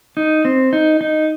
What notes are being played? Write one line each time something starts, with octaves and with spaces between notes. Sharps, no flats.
D#4
C4
D#4
D#4